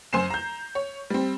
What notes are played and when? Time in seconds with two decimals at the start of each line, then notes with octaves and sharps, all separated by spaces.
0.13 F#2 C5 G#5 C7 E7
0.30 A#5 G6
0.75 C#5
1.10 G3 C4